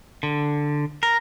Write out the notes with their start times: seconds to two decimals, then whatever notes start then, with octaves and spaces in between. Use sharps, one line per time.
0.23 D3
1.03 A#4